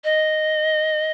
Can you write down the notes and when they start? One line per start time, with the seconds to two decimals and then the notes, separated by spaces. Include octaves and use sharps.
0.04 D#5